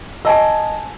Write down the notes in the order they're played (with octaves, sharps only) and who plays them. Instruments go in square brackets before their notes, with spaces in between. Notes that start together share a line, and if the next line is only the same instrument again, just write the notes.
[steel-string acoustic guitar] D#5 [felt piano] G#5 A5 E6